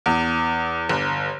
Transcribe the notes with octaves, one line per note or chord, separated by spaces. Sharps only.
E2
G1